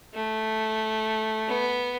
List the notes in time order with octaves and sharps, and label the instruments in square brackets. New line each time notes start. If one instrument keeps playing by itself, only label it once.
[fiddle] A3
B3